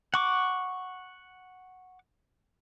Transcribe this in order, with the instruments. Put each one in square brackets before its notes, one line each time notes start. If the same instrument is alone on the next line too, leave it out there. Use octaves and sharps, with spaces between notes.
[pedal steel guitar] F#5 C#6 D6